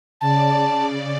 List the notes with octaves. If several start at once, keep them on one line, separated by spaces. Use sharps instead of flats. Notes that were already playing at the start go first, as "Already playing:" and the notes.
C#3 D5 A5